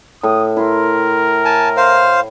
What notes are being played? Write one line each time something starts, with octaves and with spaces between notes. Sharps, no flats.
A2 D#6
E4 A#4 C6
G#5 A5
C5 F5